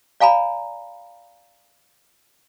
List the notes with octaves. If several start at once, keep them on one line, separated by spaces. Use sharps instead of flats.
D5 F5 G#5 A#5 B5